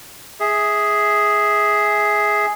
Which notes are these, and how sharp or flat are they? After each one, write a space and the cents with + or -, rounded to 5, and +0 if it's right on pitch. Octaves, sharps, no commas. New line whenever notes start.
G#4 +0 E5 -25